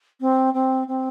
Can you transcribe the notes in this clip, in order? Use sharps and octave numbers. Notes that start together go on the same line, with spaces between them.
C4
C4
C4